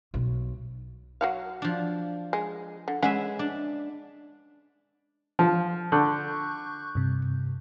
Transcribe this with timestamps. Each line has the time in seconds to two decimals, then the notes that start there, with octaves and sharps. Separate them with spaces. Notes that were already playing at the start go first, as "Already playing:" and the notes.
0.14 B1
1.21 F#3 F#4 F5
1.62 F3 D4
2.33 G#3
2.88 D3
3.02 G#3 C#4 G#4 B4 E5 F#5
3.39 D4
5.39 F3
5.92 D3 C#6 F#6 G6
6.95 G2 C3